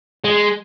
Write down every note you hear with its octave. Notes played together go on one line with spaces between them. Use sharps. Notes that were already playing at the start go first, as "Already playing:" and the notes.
G#3